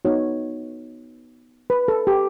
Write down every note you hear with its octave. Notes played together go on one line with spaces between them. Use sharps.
B3 D#4 F#4 C#5
B4
A4
G4